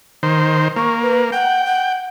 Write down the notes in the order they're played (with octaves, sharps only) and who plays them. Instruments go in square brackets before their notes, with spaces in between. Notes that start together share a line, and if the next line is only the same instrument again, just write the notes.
[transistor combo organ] D#3 C5
[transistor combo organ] A#3 [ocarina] C#6
[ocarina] B4
[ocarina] F#5 [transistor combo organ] G5
[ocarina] F#5